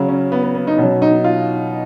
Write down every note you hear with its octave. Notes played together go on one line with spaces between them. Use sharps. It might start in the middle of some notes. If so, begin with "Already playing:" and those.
Already playing: C#3 F#3
C#4
B3
B3
B3
D#4
B2 F#3 C#4
D#4
F4